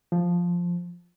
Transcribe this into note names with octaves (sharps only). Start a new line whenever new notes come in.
F3